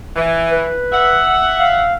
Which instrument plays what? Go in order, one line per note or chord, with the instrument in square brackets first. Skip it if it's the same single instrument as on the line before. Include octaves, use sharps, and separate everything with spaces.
[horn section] E3
[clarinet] B4
[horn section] E5 F#5
[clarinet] F5